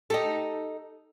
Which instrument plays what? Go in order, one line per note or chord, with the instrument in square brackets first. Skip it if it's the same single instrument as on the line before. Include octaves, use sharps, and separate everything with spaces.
[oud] D#4 G4 A4